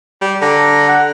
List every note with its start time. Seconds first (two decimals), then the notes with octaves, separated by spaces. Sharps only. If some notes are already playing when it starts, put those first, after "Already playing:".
0.22 G3
0.42 D3 A#5
0.88 F#5